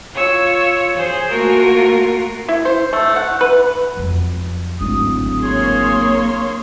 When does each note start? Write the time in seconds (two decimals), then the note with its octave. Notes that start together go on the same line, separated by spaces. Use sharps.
0.14 F4 C#5 E6
0.97 G#4 C5
1.31 A3 A#3 F4 F#4 A#4
2.48 E4
2.65 C5
2.93 A3
3.16 F#5
3.41 B4
3.97 F2 F#3
4.81 D1 G#1 D#6
5.42 A#3 G#4 C#5 C6